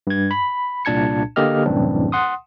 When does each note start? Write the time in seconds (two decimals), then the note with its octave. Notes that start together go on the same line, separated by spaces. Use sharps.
0.07 G2 G#6
0.31 B5
0.85 C2 A#2 D4 A5 G#6 C#7
1.36 D3 A#3 G4 D#5 F6
1.66 C2 F#2 A2 E3 C4 D4
2.12 F#5 C6 D#6